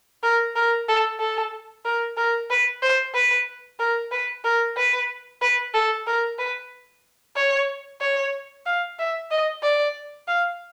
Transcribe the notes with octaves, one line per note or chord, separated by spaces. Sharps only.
A#4
A#4
A4
A4
A#4
A#4
B4
C5
B4
A#4
B4
A#4
B4
B4
A4
A#4
B4
C#5
C#5
F5
E5
D#5
D5
F5